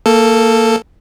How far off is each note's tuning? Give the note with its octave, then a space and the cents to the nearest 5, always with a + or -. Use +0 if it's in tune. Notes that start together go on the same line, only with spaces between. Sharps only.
A#3 -15 A4 +0